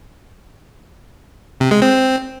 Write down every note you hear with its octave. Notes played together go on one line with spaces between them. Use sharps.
C3
G#3
C4